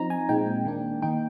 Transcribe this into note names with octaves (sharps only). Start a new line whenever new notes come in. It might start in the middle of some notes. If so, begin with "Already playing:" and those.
Already playing: F3 C4 D#4 A#5
G#5
A#2 G#3 C4 D#4 G5
D#3 A#3 D4
D#3 A#3 D#4 G5